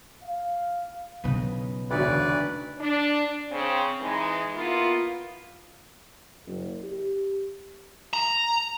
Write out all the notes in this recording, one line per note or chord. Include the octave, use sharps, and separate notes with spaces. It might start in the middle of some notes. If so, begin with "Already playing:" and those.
F5
B1 C#3 F3 D#4 B4
E1 D2 A3 D4 D#4 B4 D5
D4
C#3 C4
E3 G#3 D#4
A#3 B3 E4 F4
F#1
G4
A#5